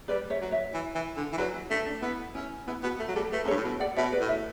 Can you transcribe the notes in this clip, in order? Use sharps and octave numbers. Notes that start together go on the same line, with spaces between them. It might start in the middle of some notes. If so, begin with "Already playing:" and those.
G3 B4 D5
C#5 E5
F#3
C#5 E5
E3
E3
D3
E3
F#3 B4 D5
E4
A3 D4
D4
B3 E4
C#4 E4
B3 E4
B3 F#4
A3
F#3
G3 A4
A3 B4
F#2
G2 A4 C#5
A2
B2
D5 F#5
B2 C#5 E5
B4 D5
A2
C#5 E5